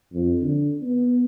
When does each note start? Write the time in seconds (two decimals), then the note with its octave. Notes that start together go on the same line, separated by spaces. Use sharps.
0.12 F2
0.41 D3
0.82 B3